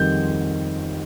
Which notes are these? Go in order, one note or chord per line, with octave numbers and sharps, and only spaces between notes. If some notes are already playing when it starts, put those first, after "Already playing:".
Already playing: F2 D#3 G3 G6